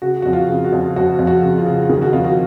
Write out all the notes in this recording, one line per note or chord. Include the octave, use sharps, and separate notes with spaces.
C#3 F#4
F2 F#4
F4
C#3
F#4
F2
F2 F#4
F2
F#4
C#3
F4
C#3
D#3 G#4
F#4
F2 F4
F#4